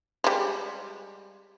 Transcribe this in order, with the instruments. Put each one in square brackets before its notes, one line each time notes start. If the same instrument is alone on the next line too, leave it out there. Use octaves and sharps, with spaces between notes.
[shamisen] G3 G#3